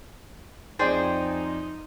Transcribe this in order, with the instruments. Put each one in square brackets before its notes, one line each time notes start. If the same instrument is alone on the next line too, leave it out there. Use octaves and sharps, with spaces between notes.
[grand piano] F2 D5 A6 [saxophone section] D#4 [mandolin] G#4 C5 G5